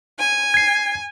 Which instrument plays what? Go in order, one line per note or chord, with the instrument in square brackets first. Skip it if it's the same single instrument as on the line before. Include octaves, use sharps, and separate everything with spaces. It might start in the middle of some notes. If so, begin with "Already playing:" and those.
[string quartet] G#5
[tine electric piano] G#6 C7